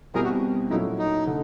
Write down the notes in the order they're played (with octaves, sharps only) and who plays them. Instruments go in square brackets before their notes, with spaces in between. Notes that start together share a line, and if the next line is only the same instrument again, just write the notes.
[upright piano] B2 G3 C4 E4 G4 [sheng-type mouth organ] G#4 A#4
[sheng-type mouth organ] F#4
[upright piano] A#2 F#3 A3 C#4 E4 [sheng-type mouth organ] D#4
[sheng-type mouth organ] D#4
[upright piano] D3